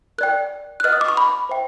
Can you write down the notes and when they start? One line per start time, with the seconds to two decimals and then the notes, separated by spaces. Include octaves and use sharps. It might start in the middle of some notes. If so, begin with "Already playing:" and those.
0.18 A#4 D5 G5 F#6
0.80 F#6
0.84 B4 D#5 F#5 F6
0.93 D#6
1.01 D6
1.08 C#6
1.17 B5
1.49 C5 E5 G5